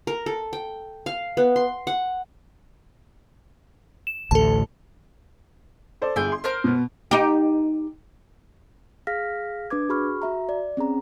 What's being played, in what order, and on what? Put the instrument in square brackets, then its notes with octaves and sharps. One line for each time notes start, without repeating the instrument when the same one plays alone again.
[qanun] A#4
A4
G5
F5
B3
C6
F#5
[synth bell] E7
[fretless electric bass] A1 D2 A2 [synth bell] A4 A5
[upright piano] A4 C5 D5
[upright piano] G1 [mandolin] E4 G#4 G5
[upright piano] C6
[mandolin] A#4 C5 F6
[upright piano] B2 B3
[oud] D#4 G4
[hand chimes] G#4 F5 F6 A#6 B6
D4 B4 D6 G#6
F#4 G#4 B5 C#6 F6
F#4 E5 A#5
D5
C4 C#4 G#4 A#5